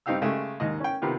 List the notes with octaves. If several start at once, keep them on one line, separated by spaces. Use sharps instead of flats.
G2 C4 D#4 G4 F5 E6
C#3 G#3 A3 G4
D#2 G#2 D#5
C#4 G5
C3 D#3 B3 F4 G4